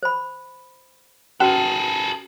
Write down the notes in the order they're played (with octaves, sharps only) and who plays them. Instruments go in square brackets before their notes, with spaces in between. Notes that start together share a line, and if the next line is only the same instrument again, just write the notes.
[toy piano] C5 B5
[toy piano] C#4 F#4 B4 [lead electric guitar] G#4 A4